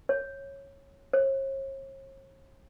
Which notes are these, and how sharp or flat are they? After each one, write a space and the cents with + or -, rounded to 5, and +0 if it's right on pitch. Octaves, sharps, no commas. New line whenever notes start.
C#5 -10
C#5 -45